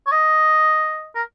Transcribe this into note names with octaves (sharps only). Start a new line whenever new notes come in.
C#5
D#5
A#4